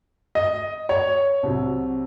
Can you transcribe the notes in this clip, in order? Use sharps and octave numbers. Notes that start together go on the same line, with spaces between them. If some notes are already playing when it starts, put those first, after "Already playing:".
D#5
C#5
C2 C3 F#3